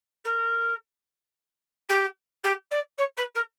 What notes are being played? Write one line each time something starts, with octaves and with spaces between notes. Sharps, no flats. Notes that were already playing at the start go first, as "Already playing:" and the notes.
A#4
G4
G4
D5
C#5
B4
A#4